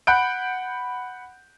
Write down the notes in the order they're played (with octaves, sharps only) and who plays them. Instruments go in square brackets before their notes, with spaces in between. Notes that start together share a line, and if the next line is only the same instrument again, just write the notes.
[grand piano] F#5 B5 F#6 G6 D7